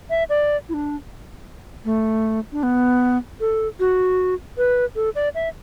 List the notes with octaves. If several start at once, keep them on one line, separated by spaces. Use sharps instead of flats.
E5
D5
E4
D4
A3
D4
B3
A4
F#4
B4
A4
D5
E5